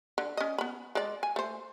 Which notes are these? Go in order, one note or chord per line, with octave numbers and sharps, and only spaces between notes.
D3
C#4 D#5
B3 B5
G#3 D5
G#5
A3 C5